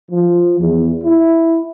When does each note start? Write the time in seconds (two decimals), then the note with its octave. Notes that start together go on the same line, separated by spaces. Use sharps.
0.11 F3
0.60 E2
1.03 E4